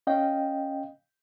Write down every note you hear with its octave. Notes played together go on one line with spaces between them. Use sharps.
C#4 D#5 F5 G5